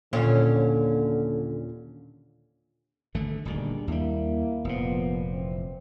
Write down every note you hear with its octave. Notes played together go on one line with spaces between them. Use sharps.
D#2 A#2 D3 C#4
G#1 D3 A3
D#1 D2 D#3 G3 G#3 D4
D#2 G3 A#3 E4
F1 A#2 F3 A#3 B3
E3 C4